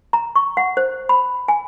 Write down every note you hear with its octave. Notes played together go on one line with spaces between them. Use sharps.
A#5
C#6
F#5
C5
B5
G#5